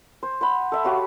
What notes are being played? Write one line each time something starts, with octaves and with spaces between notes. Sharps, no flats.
C5
C5 F#5 B5
A4 E5
F#4 G4 C#5 F5